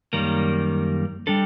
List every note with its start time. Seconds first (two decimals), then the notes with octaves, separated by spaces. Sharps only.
0.13 F#2 D#3 G3 A#3
1.27 G3 D4 A4